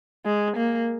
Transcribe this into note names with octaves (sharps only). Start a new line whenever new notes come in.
G#3
A#3